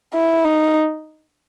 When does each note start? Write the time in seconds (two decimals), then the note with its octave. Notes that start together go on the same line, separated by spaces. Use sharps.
0.14 E4
0.44 D#4